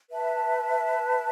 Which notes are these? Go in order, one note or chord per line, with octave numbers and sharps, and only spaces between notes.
B4 E5 A5